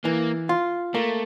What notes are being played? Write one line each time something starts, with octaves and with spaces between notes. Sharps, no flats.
E3 A#3
F4
A3 A#3